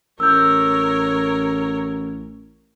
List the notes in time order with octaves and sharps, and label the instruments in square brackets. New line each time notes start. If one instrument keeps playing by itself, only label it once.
[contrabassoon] A1 [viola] A#4 C#5 [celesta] E6 G6